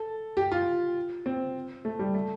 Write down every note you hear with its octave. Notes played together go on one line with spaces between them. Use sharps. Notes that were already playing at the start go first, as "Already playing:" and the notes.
Already playing: A4
G4
F4
C4
A3
G3
A3